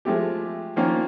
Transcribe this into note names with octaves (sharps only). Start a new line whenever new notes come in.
F3 G#3 A3 G4
D#3 F3 A#3 C#4 F4